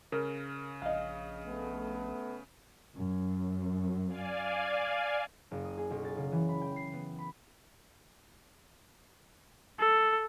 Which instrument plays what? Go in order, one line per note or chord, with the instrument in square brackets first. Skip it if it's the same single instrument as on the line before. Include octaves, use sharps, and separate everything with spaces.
[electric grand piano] C#3 [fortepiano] A#4
[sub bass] A#1 [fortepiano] D#5 F5
[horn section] A3 B3
[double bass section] F#2
[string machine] D5 F5 G#5
[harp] F#1
D#6
G#4
B1
A6
C#3
E3
B5
G5
C7
B3
B5
[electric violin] A4